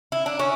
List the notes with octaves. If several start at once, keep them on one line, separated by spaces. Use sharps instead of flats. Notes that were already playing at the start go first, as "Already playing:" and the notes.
E4
D4
C#4